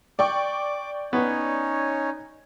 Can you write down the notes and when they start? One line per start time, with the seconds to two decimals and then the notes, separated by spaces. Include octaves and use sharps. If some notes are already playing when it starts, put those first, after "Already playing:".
0.19 D5 G5 C#6 D6
1.13 B3 C#4 D#4 C#5